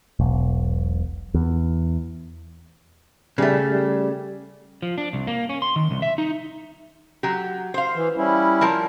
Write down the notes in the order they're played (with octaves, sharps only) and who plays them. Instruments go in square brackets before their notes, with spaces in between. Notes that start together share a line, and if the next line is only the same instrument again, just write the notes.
[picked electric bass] E1 B1
E2
[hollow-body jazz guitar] C#3 A3 [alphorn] G3
[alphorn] G3
[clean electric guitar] F3
D4
C2
A#3
C#4
C6
D#3
C2
E5
D#4
[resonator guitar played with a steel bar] F#3 G4
C5 F5
[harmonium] E3
G3 C#4 E4
[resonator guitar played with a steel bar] F3 A#4 A5